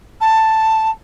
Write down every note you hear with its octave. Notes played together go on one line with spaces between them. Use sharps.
A5